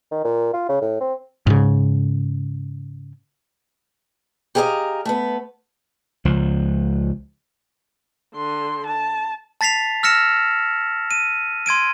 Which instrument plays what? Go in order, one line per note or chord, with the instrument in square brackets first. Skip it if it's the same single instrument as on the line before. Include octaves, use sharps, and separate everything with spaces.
[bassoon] D#3
A#2
F4
C#3
A2
C4
[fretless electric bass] G#2 C#3
[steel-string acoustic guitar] G4 G#4 A#4 C#5 D#5 F5
A3 B3
[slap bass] C#2 F3
[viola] D3 C6
A5
[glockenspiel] A5 A6 B6 C7 F7
E6 F6 A#6 C#7 E7
D#7
C6 G#6 D7 D#7